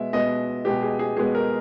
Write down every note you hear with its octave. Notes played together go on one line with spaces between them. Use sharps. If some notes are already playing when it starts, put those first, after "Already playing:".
Already playing: B2 G#3 B3 E5
B2 G#3 B3 D#5
B2 G#3 B3 G4
G#4
G#4
B2 G#3 B3 G#4
A#4